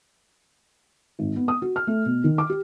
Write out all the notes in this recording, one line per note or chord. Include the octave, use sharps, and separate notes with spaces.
G#1
B3
D#6
F#4
F6
A3
B2
D#3
D6
G4